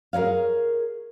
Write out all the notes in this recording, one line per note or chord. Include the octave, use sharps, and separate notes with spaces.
G#4 A#4 C#5 F5